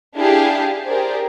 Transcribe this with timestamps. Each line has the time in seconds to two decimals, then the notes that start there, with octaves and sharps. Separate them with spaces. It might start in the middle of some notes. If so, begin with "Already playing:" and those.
0.17 D4 E4 G4 G#4 F5
0.86 G4 G#4 A#4 C5 D5